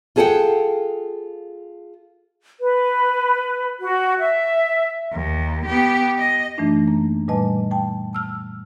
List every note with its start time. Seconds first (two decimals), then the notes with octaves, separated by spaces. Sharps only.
0.16 F4 G#4 A4 C5 F#5 G5
2.60 B4
3.80 F#4
4.19 E5
5.12 D#2
5.66 B3 G4
6.19 D#5
6.57 F#2 E3 A3 D4 D#4
6.88 A#3
7.28 A#2 G3 B4 D#5 G#5 A5
7.71 G5 A5
8.13 A5 E6 F6